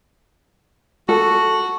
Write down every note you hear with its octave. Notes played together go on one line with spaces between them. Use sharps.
F#4 A4